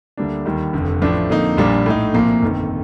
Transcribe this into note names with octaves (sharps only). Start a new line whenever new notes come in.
D2 D3 G3 A#3 D4
D#2 D#3 G3
F1 F2 D3
A1 A2 F3 A3 D4
F2 D3 F3 A#3 D#4
A#1 A#2 G3 A#3 D4
A2 A3 D#4
C2 A#2 F3 A#3
G1 F2 D#3